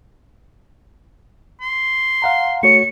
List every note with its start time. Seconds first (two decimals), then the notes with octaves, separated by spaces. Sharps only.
1.61 C6
2.22 F5 F#5 A#5
2.63 A3 F#4 C#5 C#7